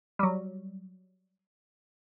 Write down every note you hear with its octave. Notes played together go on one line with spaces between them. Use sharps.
F#3 G3